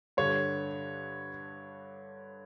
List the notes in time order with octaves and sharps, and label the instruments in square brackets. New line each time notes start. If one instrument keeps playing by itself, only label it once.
[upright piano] G2 D3 C#5